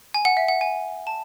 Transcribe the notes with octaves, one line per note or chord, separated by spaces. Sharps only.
G#5
F#5
E5
F#5
G#5
A5